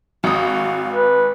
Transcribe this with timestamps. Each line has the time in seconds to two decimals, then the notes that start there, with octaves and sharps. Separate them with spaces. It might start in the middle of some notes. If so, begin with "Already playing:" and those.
0.24 G#1 F#4 F5 D#6
0.92 B4